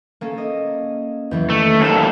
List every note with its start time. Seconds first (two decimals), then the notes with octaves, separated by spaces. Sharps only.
0.21 A#3 C#4 A4
0.38 D#5
1.31 E2 E3 F#3
1.50 D#3 A3
1.81 D#2 A4 A5